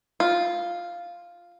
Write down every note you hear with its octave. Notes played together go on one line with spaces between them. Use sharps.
F4